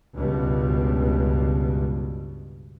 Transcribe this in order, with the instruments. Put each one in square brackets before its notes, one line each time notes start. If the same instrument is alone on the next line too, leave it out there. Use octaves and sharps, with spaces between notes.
[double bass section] C#2 G2 B2